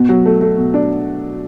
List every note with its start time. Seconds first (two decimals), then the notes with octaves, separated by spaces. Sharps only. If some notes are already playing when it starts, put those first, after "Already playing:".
Already playing: B2 B3
0.09 F#3
0.26 A3
0.41 A3
0.58 B2
0.74 D4